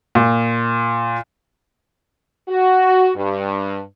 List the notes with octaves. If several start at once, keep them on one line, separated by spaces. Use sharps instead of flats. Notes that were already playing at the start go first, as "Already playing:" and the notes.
A#2
F#4
G2